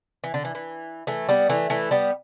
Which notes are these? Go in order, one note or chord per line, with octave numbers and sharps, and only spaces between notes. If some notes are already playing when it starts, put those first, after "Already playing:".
E3
D3
E3
E3
E3 A3
G3 B3
E3 A3
E3 A3
G3 B3